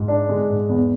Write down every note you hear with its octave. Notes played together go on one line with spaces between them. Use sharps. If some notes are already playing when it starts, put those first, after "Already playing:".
Already playing: G#2
D4
G#3
G#2
E2